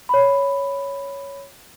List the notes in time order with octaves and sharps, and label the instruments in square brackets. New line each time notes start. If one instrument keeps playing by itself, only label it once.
[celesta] C#5 B5